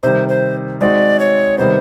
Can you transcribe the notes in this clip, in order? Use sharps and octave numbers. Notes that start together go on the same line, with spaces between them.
C3 D#3 G3 C5
C5
G#3 C4 D#4 F#4 D5
C#5
C3 D#3 G3 B3 C5